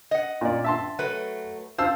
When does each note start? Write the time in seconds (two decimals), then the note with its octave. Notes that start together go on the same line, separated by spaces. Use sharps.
0.11 D#5 F#5
0.41 A#2 D5
0.64 E5 A5 C6
0.99 F#3 A3 B4
1.78 C5 F5 A5 E6